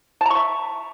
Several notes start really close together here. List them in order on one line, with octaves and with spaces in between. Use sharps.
A5 A#5 C#6 E5